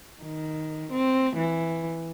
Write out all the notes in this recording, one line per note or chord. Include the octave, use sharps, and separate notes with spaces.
D#3
C4
E3